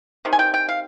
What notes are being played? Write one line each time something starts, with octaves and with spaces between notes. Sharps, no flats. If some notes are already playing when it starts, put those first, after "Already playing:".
C3 D#3
G#5
G5
G5
F5